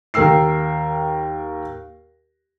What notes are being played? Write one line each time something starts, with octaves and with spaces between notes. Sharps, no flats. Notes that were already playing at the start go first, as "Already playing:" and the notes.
D#2 A#4 G5 E6 C7